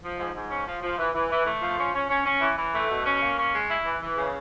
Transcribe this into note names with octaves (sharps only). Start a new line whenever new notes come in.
F3
G#2
G#2
C#4
F3
F3
E3
E3
E3
A3
F3
C#4
C#4
C#4
C#4
E3
E3
A3
B2
C#4
A#3
C#4
G#3
E4
E3
E3
C#3